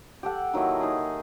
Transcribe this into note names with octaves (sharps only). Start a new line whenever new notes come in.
G4 A4 F#5
D#3 F#3 A#3 E4
D#4 G#4